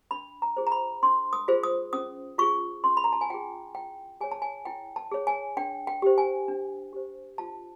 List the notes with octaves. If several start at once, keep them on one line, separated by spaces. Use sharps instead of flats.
D4 B5
A#5
F4 G#4 C5
A#5
B5
D4 C6
D#6
F4 G#4 C5
D#6
C#4 D#6
F4 G#4 C#6
C#4 C6
B5
A#5
A5
G#5
F4 G#4 G5
E4 G5
G#4 C#5 G#5
A5
G#5
E4 G5
A5
G#4 C#5
G#5
D4 G5
G5
G4 C5
G#5
D4
G4 C5
F4 A5